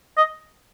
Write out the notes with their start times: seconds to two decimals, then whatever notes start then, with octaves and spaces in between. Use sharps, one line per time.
0.17 D#5